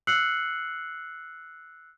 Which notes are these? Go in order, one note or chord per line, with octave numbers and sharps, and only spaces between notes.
E6 F#6 C7 C#7 F#7